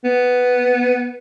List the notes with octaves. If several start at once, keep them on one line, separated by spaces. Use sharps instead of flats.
B3